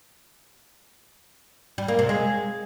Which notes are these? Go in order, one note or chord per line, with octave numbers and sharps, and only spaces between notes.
G3
A#3
C3
G#3